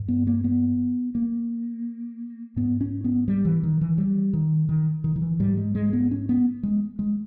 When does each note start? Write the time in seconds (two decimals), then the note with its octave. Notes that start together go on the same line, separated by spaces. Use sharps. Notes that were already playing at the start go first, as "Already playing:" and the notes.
Already playing: G2
0.08 B3
0.27 A#3
0.44 B3
1.15 A#3
2.56 G#2 B3
2.81 C#4
3.04 B3
3.28 G3
3.45 E3
3.63 D#3
3.81 E3
3.98 G3
4.33 D#3
4.69 D#3
5.04 D#3
5.16 D#3
5.22 E3
5.40 G#2 G3
5.57 G#3
5.75 G#3
5.93 B3
6.11 C#4
6.29 B3
6.63 G#3
6.99 G#3